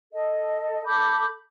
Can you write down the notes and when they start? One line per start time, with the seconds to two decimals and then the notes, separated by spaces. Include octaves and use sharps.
0.12 A4 D#5
0.85 A4 B5 D6 G6